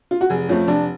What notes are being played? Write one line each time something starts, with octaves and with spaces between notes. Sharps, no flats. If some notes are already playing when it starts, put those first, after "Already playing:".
F4
F#4
F1 G#4
F2 F3 A3 C#4
F1 D4